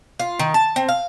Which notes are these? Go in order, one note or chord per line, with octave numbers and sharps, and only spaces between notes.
F4
D#3
A5
C4
F5